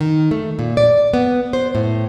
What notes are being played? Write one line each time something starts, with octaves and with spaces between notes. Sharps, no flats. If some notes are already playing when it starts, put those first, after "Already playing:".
D#3
A3
A#2
D5
B3
C5
A2